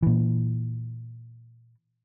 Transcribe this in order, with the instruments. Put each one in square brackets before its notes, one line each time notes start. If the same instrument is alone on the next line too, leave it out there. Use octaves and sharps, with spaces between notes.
[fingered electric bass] A#2 E3